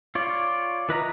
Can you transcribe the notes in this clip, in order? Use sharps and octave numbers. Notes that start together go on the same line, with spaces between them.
F4 C#5 D5
E3 B4 D#5 A#5